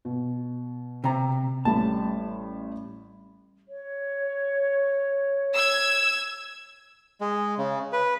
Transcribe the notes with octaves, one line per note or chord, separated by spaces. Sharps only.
B2
C3 A#5
A1 G3 A5 B5
C#5
E6 G#6 E7
G#3
C#3
B4